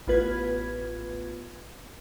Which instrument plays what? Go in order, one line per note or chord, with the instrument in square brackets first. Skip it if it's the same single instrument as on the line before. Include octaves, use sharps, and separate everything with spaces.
[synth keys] A1 B3 F4 B4 G#6